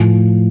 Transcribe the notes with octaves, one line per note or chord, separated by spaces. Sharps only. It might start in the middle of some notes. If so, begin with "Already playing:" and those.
Already playing: A2 F3